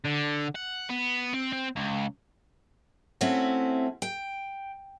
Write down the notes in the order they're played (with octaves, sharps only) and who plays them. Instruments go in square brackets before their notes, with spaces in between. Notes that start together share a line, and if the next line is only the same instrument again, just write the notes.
[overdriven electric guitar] D3
F#5
B3
C4
C4
C#2
[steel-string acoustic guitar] A3 C4 C#4 E4 F#4
G5